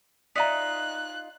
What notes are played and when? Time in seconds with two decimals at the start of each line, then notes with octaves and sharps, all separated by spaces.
0.36 D#4 F4 D5 E5 A#5 F#6 B6